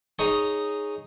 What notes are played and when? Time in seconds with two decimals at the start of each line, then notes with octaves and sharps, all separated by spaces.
0.19 D#4 G#4 C#5